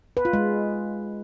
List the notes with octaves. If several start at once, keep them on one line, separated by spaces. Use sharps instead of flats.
B4
F4
G#3